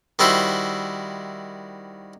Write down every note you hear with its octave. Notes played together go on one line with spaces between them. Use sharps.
D#3 G3 E4 F#4 C5